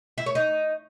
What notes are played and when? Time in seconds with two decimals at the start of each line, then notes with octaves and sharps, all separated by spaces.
0.18 E4
0.26 C#5
0.35 D#4